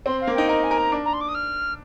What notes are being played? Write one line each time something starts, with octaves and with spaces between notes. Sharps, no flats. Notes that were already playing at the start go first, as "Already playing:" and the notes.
C4 C6
F5
A#3
D#4 G5
A#4 D#5
G#5
A#4
A#5
D4
A#5
C6
D6
D#6
F6